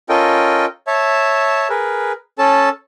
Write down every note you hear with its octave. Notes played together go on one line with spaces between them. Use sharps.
C#4 F4 A4 A#4 D#5 G5
C#5 E5 A5
G#4 A#4 B4
C#4 A4 A5